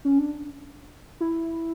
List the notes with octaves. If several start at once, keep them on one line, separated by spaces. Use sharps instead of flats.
C#4
D4
E4